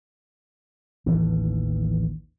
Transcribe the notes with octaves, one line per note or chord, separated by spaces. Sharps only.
A1 D#2 E3